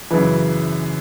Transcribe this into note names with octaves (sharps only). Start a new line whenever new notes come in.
F#2 C#3 E3 B4